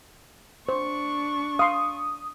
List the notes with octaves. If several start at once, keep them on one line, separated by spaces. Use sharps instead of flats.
D4 C5 C#6
F5 C6 D#6